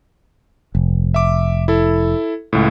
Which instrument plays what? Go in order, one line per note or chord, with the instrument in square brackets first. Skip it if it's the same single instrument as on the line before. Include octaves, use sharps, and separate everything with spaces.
[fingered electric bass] F1
[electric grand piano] E5 D6
E4 A4
C#2 A2